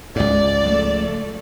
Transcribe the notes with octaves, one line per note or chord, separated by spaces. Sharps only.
C#2 G#2 D5
F3 A3